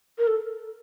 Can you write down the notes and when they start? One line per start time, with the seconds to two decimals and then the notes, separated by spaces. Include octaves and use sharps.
0.18 A#4
0.27 A4